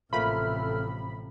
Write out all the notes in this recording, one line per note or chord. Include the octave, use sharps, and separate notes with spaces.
A1 C3 F3 A3 A#3 A4 B5 F6